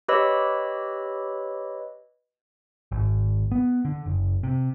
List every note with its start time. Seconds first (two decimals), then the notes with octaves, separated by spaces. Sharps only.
0.08 G4 B4 C#5 D#5 B5 E6
2.92 G#1
3.52 B3
3.85 D3
4.06 F#1
4.43 C3